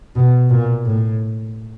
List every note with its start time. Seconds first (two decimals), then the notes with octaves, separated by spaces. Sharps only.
0.16 B2
0.50 A#2
0.85 A2